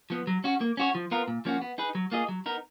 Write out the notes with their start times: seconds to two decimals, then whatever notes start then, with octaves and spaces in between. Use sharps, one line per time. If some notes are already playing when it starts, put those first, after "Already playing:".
0.10 F3 B3
0.27 F#3
0.44 C#4 F#4
0.61 A#3
0.77 C#4 F#4 C#5
0.95 F3
1.11 B3 F4 A#4
1.28 A#2
1.45 F3 A#3 C#4 F#4
1.62 B3
1.78 D#4 G#4 B4
1.95 F#3
2.12 A#3 F4 G#4 D#5
2.29 F#3
2.46 B3 D#4 A#4